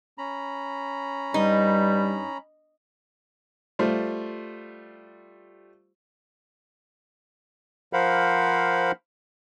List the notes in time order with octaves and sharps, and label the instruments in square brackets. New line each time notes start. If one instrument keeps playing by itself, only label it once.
[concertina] C#4 A#5 B5
[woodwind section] G2 G3 [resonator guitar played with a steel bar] D#4
[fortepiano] G3 A3 F4 C5
[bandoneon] F3 A#4 C5 F5 F#5 B5